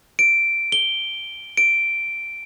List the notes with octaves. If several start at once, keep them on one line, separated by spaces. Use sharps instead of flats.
D7
G7
D7